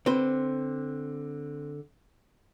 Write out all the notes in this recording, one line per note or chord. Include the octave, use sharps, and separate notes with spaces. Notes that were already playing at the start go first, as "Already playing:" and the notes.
D3 C4 B4 C5